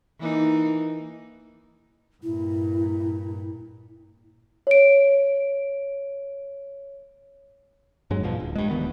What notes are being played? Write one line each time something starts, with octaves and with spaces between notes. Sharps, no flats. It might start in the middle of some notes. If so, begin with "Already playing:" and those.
E3 A#3 D#4
G2 A#2 E4
C#5 D7
G2 F#3 G#3
A#1 G2 B2 F3
D1
G2 G#3
D1 D2 D#3 B3